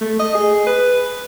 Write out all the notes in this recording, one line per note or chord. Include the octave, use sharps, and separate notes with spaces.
A3
D#5
G#4
B4